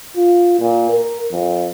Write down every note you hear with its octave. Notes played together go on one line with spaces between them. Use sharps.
F4
A#2
A#4
F2